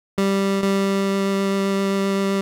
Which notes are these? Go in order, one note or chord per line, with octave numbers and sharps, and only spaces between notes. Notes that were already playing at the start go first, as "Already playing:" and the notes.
G3
G3